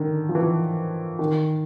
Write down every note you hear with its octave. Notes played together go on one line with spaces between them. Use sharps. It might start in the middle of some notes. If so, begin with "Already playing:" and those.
Already playing: D3 D#3
F3
E3
D#3